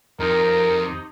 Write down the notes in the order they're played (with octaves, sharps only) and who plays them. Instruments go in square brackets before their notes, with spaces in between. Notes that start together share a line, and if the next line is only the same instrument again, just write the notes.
[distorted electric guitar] F2 [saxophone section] C3 D#4 [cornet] A#4